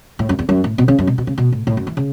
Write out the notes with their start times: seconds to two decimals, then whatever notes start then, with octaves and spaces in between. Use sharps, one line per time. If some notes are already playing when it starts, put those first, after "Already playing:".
0.19 A2
0.29 F#2
0.39 E2
0.49 F#2
0.64 A2
0.78 B2
0.88 C#3
0.99 F#2
1.07 B2
1.18 B2
1.27 C#3
1.38 B2
1.52 A2
1.67 A2
1.77 F#2
1.87 E3
1.97 C#3